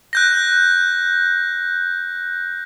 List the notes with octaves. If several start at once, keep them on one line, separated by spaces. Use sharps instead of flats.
F#6 G6 A#6